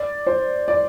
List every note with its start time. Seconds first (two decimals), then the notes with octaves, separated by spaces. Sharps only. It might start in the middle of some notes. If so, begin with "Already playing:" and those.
Already playing: D5
0.27 C5
0.68 D5